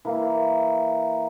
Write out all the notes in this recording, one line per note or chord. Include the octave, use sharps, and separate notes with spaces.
E3 A#3